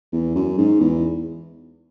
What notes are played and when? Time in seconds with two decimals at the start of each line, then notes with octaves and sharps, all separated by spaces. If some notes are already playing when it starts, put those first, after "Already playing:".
0.13 E2
0.35 F#2
0.58 G#2
0.80 E2